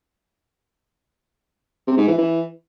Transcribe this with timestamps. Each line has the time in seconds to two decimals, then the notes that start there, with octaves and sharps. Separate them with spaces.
1.87 C3
1.97 G#2
2.08 E3
2.18 E3